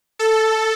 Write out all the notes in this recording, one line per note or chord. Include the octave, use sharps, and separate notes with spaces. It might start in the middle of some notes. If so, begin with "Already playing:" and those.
A4